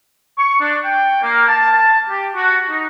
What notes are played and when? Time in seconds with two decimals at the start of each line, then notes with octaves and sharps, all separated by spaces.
0.38 C#6
0.61 D4
0.84 G5
1.23 A#3
1.48 A5
2.10 G4
2.35 F#4
2.70 D#4